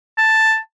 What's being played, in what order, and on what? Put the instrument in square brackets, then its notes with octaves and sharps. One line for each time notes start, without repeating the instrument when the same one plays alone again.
[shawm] A5